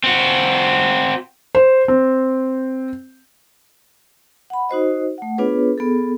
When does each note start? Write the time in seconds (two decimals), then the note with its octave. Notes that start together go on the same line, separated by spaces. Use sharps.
0.04 C4 F#4
1.55 C5
1.88 C4
4.50 F#5 B5
4.69 D#4 F#4 C5 D#5
5.18 A3 F#5
5.38 B3 D4 F4 G#4 B4 C#5
5.78 B3 G#4 A4